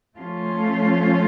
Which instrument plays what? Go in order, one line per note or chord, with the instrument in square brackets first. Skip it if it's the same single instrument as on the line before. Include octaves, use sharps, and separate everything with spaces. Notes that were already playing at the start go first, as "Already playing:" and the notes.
[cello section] F3 A3 C#4 F4